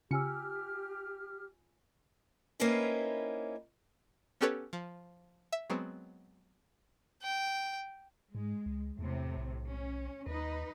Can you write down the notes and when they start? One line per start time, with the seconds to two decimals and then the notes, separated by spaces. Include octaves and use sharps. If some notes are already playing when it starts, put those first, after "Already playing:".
0.11 C#3 F4 G4 G#5 E6 F6 C#7
2.60 A#3 C4 C#4 D#4 E4 B4
4.41 B3 C#4 G4 A4 B4 C#5
4.73 F3
5.52 E5
5.70 F#3 G#3 B3 C4
7.22 G5
8.35 G#2 G#3
8.66 C#2
8.99 E2 A2 C3
9.37 B1
9.67 C#4
10.27 D#2 D#4 B4 D#5